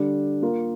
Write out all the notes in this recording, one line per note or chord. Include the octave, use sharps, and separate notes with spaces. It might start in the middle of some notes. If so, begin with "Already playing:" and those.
Already playing: D3 G3 D4
A#3 F4 A#4